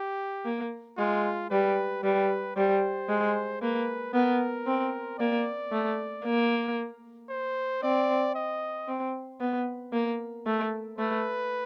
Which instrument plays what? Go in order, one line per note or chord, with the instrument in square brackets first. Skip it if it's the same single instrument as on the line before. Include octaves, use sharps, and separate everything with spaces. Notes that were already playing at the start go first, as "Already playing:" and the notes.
Already playing: [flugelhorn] G4
[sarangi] A#3
[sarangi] G#3 [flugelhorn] F4
[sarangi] G3 [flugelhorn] B4
[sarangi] G3 [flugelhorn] B4
[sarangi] G3 [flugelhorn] C5
[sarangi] G#3
[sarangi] A#3 [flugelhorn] B4
[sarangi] B3 [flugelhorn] A#4
[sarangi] C4
[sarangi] A#3 [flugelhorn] D5
[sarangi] A3
A#3
[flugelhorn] C5
[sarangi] C4 [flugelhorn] D5
[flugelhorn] D#5
[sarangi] C4
B3
A#3
A3
[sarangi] A3 [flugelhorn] B4